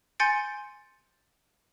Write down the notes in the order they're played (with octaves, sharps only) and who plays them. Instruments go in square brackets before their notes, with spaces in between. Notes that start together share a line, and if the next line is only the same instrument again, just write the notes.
[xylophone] G#5 C6 G6 A6 C#7 D7